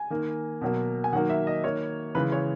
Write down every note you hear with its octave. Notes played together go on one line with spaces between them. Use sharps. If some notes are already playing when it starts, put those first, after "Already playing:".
Already playing: G#5
D#3 A#3
B2 F#3 A#3
G#5
D#3 F#3 A#3 F#5
E5
D#5
D#3 A#3 C#5
C#3 E3 G#3 B4
C#5